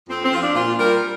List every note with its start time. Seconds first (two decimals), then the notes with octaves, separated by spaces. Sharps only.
0.09 F2 C4
0.24 C4
0.32 F3 F4
0.40 D4
0.55 A#2 F4
0.78 G3 A#4